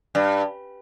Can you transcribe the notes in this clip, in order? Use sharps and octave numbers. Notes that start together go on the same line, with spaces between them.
G2